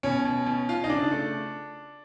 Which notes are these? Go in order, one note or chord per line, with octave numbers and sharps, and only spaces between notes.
B2 C#4
B2
B2
F4
D#4
C#3 D4
A3